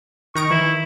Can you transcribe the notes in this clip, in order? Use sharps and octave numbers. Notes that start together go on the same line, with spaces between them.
D#3 A#5 C#6 D7
E3 E4